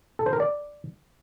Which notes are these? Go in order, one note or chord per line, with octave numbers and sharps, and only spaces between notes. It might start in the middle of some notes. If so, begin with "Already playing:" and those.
A4
C5
A#4
D5